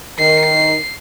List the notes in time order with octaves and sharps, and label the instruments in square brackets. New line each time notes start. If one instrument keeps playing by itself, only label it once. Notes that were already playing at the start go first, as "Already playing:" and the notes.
[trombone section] D#3 [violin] C7